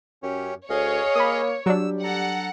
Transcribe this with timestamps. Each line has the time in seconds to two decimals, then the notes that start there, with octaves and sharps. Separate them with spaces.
0.23 F#2 C#4 G4 C#5
0.70 D2 G#4 C#5 D#5 F5
1.15 A#3 B5 D#6
1.66 F#3 G3 D4 E6
2.04 A4 F#5 A#5